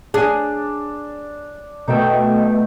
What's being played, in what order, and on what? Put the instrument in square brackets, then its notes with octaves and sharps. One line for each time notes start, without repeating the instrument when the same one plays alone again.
[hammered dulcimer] D4 [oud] G#4
[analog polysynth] B2 A3 [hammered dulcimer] D#4 E5 G5